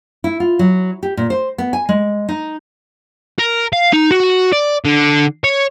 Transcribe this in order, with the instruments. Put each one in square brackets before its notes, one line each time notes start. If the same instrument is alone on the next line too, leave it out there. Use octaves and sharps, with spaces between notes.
[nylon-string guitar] E4
F4
F#3
G4
A#2
C5
B3
G#5
G#3
D#4
[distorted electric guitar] A#4
F5
D#4
F#4
D5
D3
C#5